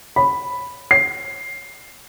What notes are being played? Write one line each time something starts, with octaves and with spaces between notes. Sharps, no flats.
B5
C7